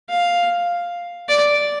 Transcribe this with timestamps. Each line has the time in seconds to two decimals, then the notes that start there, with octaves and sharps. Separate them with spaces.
0.09 F5
1.29 D5